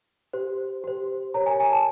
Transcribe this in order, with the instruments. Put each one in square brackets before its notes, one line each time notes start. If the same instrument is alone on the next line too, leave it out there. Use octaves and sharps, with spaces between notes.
[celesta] G4 C5
G4 C5
G4 A#4 C#5 A#5
G#5
G#5
A5